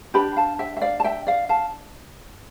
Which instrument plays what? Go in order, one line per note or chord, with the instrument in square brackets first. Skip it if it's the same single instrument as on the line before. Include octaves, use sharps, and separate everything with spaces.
[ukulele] D4 G4 B4 G5 B5
F5 A5
E5 G5
E5
D5 F5
A5
E5 G5
D5 F5
F5 A5